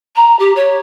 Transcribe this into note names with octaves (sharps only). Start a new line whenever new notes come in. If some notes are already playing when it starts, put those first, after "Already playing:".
A#5
G4
C#5